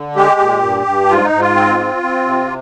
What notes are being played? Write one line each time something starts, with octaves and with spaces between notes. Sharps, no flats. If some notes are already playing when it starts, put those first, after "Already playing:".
Already playing: D3
G#3 G4
A#2
G2
G2
G#2 F4
D#4
G#2
F4
C4
C4
C4
C3